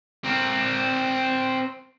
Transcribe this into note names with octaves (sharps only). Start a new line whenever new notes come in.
C4 A#4